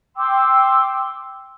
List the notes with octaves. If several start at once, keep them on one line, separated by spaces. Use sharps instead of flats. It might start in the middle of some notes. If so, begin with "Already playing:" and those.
G5 C6 D6 E6